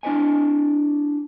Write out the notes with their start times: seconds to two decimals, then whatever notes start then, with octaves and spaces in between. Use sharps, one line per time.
0.03 D4 E4 C5 D#5 G#5